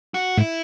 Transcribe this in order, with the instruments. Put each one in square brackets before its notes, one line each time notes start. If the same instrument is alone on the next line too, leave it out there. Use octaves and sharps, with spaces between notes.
[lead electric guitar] F#4
[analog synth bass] A2 [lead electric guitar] E4